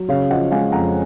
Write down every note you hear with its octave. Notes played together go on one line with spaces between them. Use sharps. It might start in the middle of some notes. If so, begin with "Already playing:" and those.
Already playing: F#3
C#3 C#5 F5
F3 D#5 F#5
G#3 F5 G#5
F2 F#5 A#5